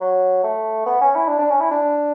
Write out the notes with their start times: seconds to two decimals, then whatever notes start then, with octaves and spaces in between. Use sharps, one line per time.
0.01 F#3
0.44 A3
0.86 B3
1.01 C#4
1.15 E4
1.28 D4
1.39 D4
1.50 C#4
1.61 E4
1.71 D4